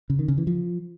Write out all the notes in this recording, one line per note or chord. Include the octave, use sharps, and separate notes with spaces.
C#3
D#3
C#3
E3
F3